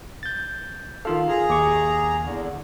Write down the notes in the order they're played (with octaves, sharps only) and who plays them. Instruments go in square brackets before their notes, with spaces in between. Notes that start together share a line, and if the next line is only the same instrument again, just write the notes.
[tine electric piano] G6 A6
[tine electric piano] D#3 F4 A4 [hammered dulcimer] F5
[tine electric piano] F4 [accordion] G#4 A#5
[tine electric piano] D#2 C#6 [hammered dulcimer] D6
[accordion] E2 D3